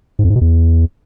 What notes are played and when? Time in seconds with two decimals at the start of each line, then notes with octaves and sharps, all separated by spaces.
0.19 G#2
0.24 F2
0.30 G#2
0.36 B2
0.41 E2